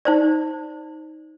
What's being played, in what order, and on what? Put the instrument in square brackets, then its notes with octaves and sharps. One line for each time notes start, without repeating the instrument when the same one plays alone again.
[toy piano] D#4 C5 D5